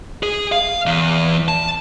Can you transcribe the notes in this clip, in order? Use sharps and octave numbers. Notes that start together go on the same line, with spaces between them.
G#4
F5
E2
A5